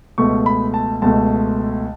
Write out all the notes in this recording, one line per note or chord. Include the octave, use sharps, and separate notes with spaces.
C#2 B2 A3 C#6
B5
A5
C#2 B2 A3 A5